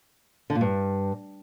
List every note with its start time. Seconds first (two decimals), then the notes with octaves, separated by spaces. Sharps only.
0.50 D3
0.55 A#2
0.61 G2